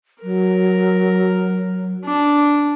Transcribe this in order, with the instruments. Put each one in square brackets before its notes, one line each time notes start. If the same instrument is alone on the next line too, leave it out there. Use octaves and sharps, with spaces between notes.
[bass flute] F#3 [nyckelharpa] A#4
[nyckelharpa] D4